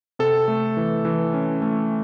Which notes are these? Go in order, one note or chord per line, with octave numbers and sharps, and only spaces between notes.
C3 A4
A3
E3
E3
C#4
A3